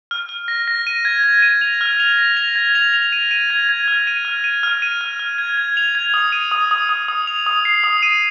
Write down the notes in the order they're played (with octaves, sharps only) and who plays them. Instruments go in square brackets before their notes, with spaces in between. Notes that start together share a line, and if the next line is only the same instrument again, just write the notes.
[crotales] F6
F6
A#6
A#6
D#7
G#6
G#6
D#7
F7
F6
F7
A#6
F7
G#6
F7
F7
D#7
D#7
G#6
G#6
F6
D#7
F6
D#7
F6
D#7
F6
F6
G#6
G#6
F7
G#6
D#6
D#7
D#6
D#6
D#6
D#6
F7
D#6
C7
D#6
D#7